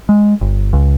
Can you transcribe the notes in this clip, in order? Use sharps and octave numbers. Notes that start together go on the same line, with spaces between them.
G#3
G1
C#2